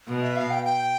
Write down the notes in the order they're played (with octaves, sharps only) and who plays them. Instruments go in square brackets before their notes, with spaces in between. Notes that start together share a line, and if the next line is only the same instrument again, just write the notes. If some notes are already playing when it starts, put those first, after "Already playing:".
[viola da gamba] B2
[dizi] E5
F5
G5
G5